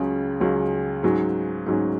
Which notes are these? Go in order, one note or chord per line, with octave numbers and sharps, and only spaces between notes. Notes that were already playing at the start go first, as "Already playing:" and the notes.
Already playing: C#2 C#3 F#3 C#4
C#2 C#3 F#3 C#4
G#2 F#3 C#4
G#2 F#3 C#4